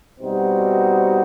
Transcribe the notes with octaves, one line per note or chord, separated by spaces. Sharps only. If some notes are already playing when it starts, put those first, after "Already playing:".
B2 G3 C4 D#4 F#4